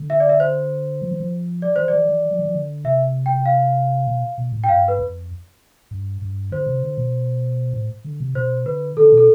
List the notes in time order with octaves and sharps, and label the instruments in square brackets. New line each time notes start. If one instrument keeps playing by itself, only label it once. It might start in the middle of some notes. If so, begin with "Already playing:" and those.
Already playing: [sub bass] D3
[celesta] E5
D5
E5
C5
[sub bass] F3
E3
F3
[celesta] D5
[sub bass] E3 [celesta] C5
[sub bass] E3 [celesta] D5
[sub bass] E3
F3
E3
F3
D3
[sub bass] C3 [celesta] E5
[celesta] G5
F5
[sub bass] B2
B2
A2
[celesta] G5
[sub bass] G2 [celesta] F5
[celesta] B4
[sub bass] F2
G2
G2
[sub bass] D3 [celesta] C5
[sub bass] C3
D3
B2
A2
D3
C3
[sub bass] B2 [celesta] C5
[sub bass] D3 [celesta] B4
[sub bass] D3 [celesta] A4
[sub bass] B2
[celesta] A4